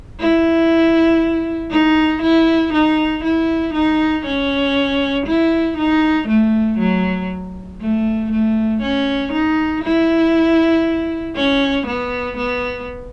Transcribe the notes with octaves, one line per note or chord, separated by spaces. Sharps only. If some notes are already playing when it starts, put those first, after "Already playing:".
E4
D#4
E4
D#4
E4
D#4
C#4
E4
D#4
A3
F#3
A3
A3
C#4
D#4
E4
C#4
B3
B3